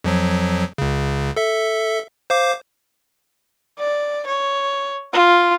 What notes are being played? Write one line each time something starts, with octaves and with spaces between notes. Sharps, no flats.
F2 F3 F#3
C#2 C#3
A4 E5
C5 F5 D6
D5
C#5
F4